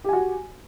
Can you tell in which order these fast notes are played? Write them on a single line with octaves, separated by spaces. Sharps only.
G4 G#5 F#4